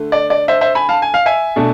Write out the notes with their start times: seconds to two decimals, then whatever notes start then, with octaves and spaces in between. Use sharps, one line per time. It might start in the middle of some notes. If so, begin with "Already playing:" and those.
Already playing: D3 A3
0.12 D5
0.30 D5
0.48 C5 E5
0.61 C5 E5
0.75 G#5 B5
0.89 F5 A5
1.02 G#5
1.14 F5
1.26 E5 G#5
1.56 B2 A3 D4